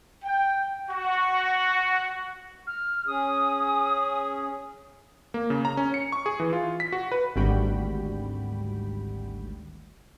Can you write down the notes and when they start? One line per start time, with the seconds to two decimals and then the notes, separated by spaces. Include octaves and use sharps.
0.24 G5
0.90 F#4
2.67 F6
3.07 C#4 G#4 D#6
5.34 A#3
5.50 C#3
5.65 A#5
5.77 C#4
5.94 C#7
6.12 C#6
6.26 G#4
6.40 E3
6.53 F4
6.80 B6
6.92 F#4
7.12 B4
7.36 G#1 D2 G3 F#4 G5 B5